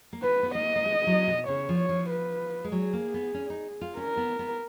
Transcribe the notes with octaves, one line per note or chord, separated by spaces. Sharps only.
A#3
B3 B4
B3
A#3 D#5
A#3
G#3
F#3
B2
C#3 C#5
F3
C#5
F3
B4
G#3
F#3 G#4
A#3
B3
C#4
D#4
F4
C#4 A#4
B3
B3